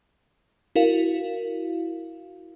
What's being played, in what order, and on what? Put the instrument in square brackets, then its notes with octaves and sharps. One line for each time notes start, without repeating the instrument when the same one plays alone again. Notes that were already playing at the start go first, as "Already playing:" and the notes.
[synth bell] E4 F#4 A#4 F5